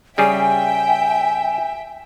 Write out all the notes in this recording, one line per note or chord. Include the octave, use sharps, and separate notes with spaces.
C#3 G3 G#4 E5 G5 G#5